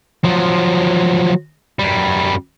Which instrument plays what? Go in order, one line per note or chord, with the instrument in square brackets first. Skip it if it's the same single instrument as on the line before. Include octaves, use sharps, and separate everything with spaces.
[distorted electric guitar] F3 F#3
F#2 G3